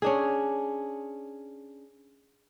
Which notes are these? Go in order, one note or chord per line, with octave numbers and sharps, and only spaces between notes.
C#4 D4 G#4